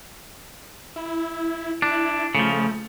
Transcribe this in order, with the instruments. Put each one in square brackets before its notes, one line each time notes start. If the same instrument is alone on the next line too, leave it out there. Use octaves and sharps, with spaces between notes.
[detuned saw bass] E4
[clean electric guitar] D4 [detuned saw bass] E4
[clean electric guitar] C#3 F3 [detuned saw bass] A3